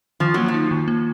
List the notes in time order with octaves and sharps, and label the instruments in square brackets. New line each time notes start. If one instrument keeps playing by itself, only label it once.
[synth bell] D#3 [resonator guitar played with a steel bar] F3
[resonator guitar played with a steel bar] F#3 [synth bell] A#3
[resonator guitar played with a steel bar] F3
[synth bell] D#4
D#3
A#3